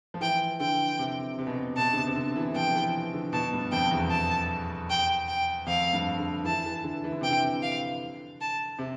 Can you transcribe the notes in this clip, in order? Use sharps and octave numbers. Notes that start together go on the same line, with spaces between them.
F3
E3 G5
D3 G5
C3
C3
B2
C3
B2 A5
D3
C3
C3
D3
E3
F3 G5
E3
D3
B2 A5
G2
F2 G5
E2
A5
G5
G5
F2 F5
G2
D3
E3 A5
E3
D3
E3
D3
C3 G5
D3
F5
A5
C3